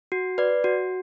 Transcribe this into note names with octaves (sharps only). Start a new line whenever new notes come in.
F#4
B4 D5
F#4